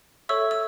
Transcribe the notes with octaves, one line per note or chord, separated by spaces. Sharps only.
A4 C#5 E5 C#6 E6
E6